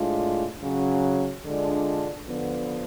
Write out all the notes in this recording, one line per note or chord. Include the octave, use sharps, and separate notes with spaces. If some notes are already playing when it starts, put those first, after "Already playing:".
Already playing: A2 G#3 D4 F4
C#3 F#3 C#4
D3 G#3 D4 F4
D3 F3 B3